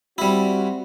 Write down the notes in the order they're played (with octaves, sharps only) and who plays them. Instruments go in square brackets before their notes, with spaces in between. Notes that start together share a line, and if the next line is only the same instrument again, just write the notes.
[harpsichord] G3 E4 [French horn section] C4 F#4